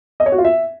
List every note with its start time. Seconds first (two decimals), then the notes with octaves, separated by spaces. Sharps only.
0.20 D#5
0.26 C#5
0.32 F#4
0.38 F4
0.44 E5